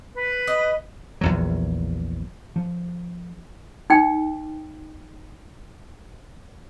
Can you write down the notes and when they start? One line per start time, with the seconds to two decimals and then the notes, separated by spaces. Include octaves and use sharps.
0.15 B4
0.47 D#5
1.21 A#1 E2 F#3
2.56 F3
3.90 D#4 G5